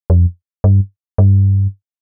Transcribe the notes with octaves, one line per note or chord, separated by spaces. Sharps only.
F2
G2
G2